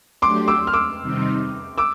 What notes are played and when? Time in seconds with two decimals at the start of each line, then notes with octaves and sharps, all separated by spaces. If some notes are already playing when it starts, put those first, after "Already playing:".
0.22 F#3 A3 D4 G4 C6 D6
0.48 D6 E6
0.67 F6
0.73 D6 E6
1.00 C3 D#3 G3 C4 D#4
1.78 D6 E6